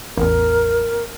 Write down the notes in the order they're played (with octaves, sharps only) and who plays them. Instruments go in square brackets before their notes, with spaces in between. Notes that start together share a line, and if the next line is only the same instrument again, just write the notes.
[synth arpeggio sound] A1 E2 [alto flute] A#4